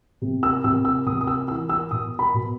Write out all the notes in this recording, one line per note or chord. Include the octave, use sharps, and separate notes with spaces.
C3
E6
C3 E6
E6
C3 D#6
D#6
E6
E3 E6
E6
B2 D#6
B5
B2